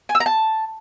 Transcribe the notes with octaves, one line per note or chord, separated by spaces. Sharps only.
G#5
E6
A#5
A5